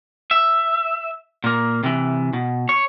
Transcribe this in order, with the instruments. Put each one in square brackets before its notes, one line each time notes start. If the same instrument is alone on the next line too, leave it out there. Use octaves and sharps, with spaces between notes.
[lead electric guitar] E5
A#2 A#3
C3 E3
B2
C#5